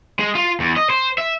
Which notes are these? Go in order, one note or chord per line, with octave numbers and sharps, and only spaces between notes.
G#3
F4
E2
D#5
C5
E5